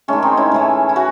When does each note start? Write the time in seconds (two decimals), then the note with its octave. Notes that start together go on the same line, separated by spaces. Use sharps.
0.08 D#3 G#3 A3 C#4
0.22 C4 D#4
0.37 C#4 E4
0.52 A2 E3 A3
0.89 E4
0.96 F#4